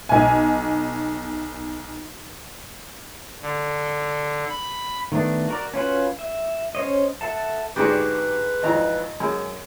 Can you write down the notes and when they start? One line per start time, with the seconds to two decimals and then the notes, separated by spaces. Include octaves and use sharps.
0.09 B1 G#5
3.42 D3
4.49 B5
5.12 D#3 A3 B3 D4
5.48 F#4 A#4 D5
5.74 C#4 F4 F#4 B4
6.19 E5
6.75 C#4 C5 C#5 D#5
7.21 A4 E5 F#5 A5
7.76 G#2 D3 G#3 D4 F#4 G4 B4
8.63 G#1 F2 E3 D#5 A#5
9.20 F#2 G#3